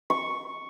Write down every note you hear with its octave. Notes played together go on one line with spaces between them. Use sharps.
C#6